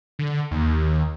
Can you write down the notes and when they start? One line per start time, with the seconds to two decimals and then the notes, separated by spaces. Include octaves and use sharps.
0.19 D3
0.51 D#2